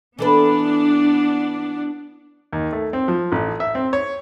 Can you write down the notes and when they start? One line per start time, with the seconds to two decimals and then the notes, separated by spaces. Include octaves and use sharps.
0.19 E3 B3 D4 A4 B4
2.53 D#2
2.73 A3
2.93 C4
3.08 F3
3.32 A1
3.60 E5
3.75 C4
3.93 C#5